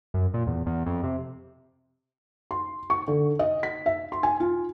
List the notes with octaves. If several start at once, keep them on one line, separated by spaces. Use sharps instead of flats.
F#2
A#2
E2
E2
F2
C3
C6
C#6
D3
D#5
B6
E5
C6
G#5
F4